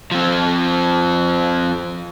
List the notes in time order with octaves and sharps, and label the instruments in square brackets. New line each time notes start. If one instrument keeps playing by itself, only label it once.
[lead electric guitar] F3 C4